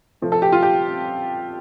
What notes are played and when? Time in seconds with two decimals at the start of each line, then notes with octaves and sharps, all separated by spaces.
0.22 C3 F3 A3
0.32 A4
0.42 G4
0.52 F4
0.63 G4